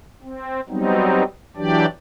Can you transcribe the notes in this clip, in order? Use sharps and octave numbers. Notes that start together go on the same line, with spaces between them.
C4
F#3 G3 B3 C4 D#4
E3 F#3 D4 G4 D5